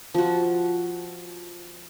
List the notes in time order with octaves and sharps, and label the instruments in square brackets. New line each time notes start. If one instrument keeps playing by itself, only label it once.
[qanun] F3 F#4